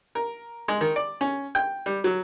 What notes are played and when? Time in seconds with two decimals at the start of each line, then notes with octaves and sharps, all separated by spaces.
0.15 A#4
0.68 G#3
0.81 D#3
0.96 D5
1.21 C#4
1.55 G5
1.86 G3
2.04 F#3